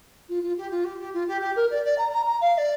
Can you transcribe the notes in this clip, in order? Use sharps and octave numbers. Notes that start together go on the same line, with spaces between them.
F4
F4
G4
F4
G4
G4
F4
G4
G4
A#4
D5
D5
A#5
A#5
A#5
F5
F5
D5